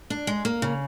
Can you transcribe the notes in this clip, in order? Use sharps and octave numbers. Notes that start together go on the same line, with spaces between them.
D4
G#3
A#3
C#3